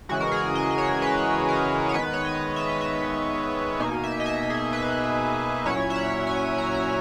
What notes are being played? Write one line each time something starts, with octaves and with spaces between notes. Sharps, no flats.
C#3 E3 G#3 F#4
A#4
G#4
D#5
D#5
C#5
B4
A#4
C#5
D#3 G#3 B3 B4
C#5
D#5
E5
D#5
E5
B2 A#3 D#4 G#5
E5
D#5
E5
G#4
B4
A#2 F#3 C#4 E4 C#5
E5
F#5
G#5
A#5
A#5